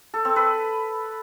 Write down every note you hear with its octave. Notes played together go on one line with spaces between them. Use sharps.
A4
C4
B4